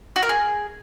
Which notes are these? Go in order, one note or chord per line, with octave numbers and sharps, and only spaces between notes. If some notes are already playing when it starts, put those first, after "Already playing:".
F#4
A#4
G#4